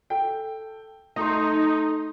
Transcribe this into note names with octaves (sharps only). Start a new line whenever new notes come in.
A4 G5
A3 D#4 C6